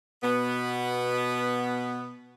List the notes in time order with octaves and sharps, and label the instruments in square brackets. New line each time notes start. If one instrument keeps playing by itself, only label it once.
[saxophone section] B2 B3